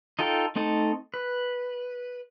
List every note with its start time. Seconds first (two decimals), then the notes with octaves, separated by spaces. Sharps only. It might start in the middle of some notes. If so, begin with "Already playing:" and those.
0.19 D#4 F4 A4 G5
0.56 A3 C4 D#4 A4
1.14 B4